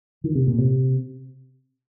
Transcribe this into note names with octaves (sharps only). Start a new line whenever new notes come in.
D#3
C3
A#2
C3